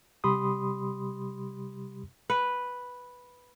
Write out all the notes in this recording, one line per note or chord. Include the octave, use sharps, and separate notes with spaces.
C3 G3 G4 B5 C6 D#6
B4